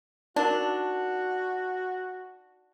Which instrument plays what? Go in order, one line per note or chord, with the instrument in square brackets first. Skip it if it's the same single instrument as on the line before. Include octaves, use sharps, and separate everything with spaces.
[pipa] D4 [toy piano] D#4 A#4 [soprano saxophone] F#4